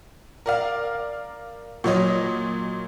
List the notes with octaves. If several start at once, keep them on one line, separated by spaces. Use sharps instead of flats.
A#4 D5 F5
A#2 F#3 C#5 D#5